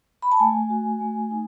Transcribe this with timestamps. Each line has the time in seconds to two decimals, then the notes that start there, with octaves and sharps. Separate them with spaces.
0.22 B5
0.32 A5
0.39 A3 G#5
0.70 F#4
1.00 A3
1.31 D#4